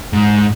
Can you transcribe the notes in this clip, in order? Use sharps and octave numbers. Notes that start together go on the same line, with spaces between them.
G#2